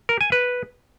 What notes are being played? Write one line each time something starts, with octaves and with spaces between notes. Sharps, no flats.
A#4
G#5
B4